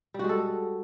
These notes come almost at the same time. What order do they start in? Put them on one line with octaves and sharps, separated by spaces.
G3 F#4 G#3 A4